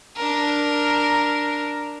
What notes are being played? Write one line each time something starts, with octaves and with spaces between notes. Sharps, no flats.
D4 A#4